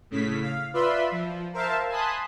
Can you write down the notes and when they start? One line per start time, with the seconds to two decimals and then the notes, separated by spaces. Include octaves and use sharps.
0.11 A2 C#3 B6
0.42 F5
0.74 F4 B4 D5 E5 B5 C6
1.11 F3
1.54 A#4 C5 E5 F5 A5
1.89 G#5 A5 B5 C6 D#6 F#6